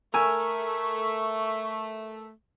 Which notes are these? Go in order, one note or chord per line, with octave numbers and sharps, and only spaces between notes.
A3 A#4 G#5 C#6 E6